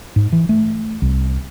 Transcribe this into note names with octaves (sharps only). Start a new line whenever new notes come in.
G#2
E3
A3
C2